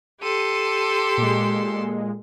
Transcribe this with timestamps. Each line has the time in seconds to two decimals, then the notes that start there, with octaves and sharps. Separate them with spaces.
0.21 G4 A4 C6 D#7
1.17 A#2 G#3